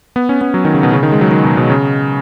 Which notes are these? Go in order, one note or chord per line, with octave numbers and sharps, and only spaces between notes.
B3
C#4
B3
F#3
D#3
C#3
B2
C#3
D#3
G#3
F#3
D#3
B2
B2
C#3